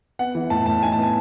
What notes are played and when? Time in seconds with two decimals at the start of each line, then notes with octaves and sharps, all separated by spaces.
0.19 B3 F#5
0.35 E3
0.50 A2 A5
0.66 A2 A5
0.82 D#4 G#5
0.92 A5
0.98 B3 G#5